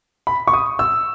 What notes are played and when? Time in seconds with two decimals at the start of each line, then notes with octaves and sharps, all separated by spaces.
0.27 B5
0.47 C#6
0.53 D#6
0.79 E6